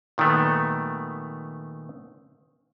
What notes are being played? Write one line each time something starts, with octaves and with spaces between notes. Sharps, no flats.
A#2 D#3 F#3 A3 B3